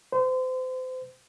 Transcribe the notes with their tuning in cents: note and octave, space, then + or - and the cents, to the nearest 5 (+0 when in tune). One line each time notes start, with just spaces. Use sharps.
C5 -35